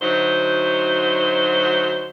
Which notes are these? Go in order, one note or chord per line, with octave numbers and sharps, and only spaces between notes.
D2 F#3 D#4 C5